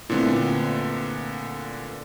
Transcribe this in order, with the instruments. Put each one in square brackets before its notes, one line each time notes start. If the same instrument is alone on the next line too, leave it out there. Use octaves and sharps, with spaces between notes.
[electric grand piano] A#2 D3 B3 [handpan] A3 C4 E4